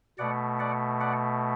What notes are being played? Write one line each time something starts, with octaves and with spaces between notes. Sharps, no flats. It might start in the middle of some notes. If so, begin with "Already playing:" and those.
B2 A3 D5 F#5
D5 F#5
D5 F#5